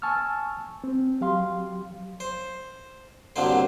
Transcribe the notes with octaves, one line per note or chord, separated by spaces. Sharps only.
G#5 A5 C#6 E6 F6
C4
F#3 G4 F5 C6
C5
C2 F#2 D3 F#3 A#3 C5